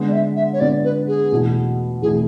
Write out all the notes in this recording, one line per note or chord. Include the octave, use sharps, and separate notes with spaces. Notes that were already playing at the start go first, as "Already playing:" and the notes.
Already playing: D3 G#3 B3
D5
E5
E5
C#5
D3 G#3 B3 D5
B4
G#4
E2 B2 A3 E4
E2 B2 A3 E4 G#4